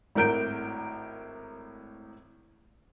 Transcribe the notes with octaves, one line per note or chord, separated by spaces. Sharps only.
G#1 A2 A#4 G6 D7